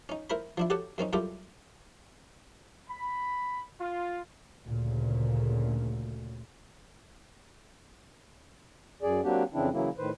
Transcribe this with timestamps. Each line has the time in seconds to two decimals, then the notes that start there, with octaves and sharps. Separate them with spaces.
0.09 C#4 D#4
0.30 E4 A#4 C5 B5
0.58 F3 D4 E4
0.70 F#4 G4 A4 C#5 F#5 A5
0.98 F#2 C4 C#4 D#4
1.13 F#2 G3 E4 F4 G4 A4
2.88 B5
3.79 F4
4.66 D2 A#2 C#3
9.02 F#2 G#4 D5
9.24 F#3 A#3 C4 D4 F#4 G4
9.54 F2 C#3 E3 C4 D4 E4
9.72 C#3 E3 F#3 A#3 E4
9.98 A2 D#3 B4 C5